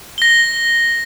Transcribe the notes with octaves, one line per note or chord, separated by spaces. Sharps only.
A#6 G7